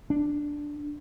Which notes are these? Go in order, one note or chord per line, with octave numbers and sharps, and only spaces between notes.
D4